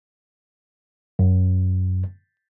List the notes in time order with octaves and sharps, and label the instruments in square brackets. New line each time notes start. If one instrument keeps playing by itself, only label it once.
[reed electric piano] F#2